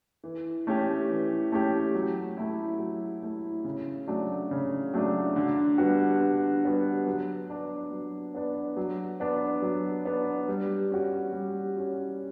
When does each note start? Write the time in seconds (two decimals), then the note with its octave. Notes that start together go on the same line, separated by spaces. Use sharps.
0.24 E3
0.67 A3 C#4 G4
1.10 E3
1.52 A3 C#4 G4
1.95 F#3
2.37 A3 E4
2.79 F#3
3.23 A3 E4
3.65 C#3
4.08 F#3 A3 D4
4.51 C#3
4.94 F#3 A3 D4
5.36 D3
5.78 G3 B3 F#4
6.21 D3
6.64 G3 B3 F#4
7.07 F#3
7.50 B3 D4
7.91 F#3
8.35 B3 D4
8.77 F#3
9.20 B3 D4
9.62 F#3
10.05 B3 D4
10.49 G3
10.91 C#4 F#4
11.33 G3
11.76 C#4 F#4